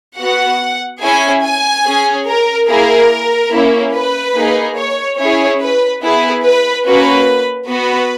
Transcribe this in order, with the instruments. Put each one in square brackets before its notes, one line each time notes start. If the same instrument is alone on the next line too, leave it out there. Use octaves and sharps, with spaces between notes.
[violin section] B3 F#4 F#5
C#4 E4 G#4 G#5
G#5
C#4 G#4
A#4
A#3 E4 G#4 A#4
A#3 C#4 E4
B4
A#3 D#4 G#4
C#5
C#4 E4 G#4 C#5
B4
B3 E4 G#4 B4
B4
A#3 C#4 F#4 B4
B3 F#4 B4